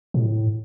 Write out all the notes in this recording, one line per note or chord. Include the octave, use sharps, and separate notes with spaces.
A2